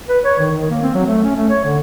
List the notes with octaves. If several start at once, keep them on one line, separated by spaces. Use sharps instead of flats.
B4
C#5
D#3
D#3
A#3
C4
F#3
A3
C#4
A3
C#5
D3